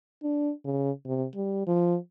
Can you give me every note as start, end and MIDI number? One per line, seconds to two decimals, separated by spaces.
0.23 0.52 62
0.65 0.91 49
1.06 1.25 48
1.35 1.64 55
1.67 1.96 53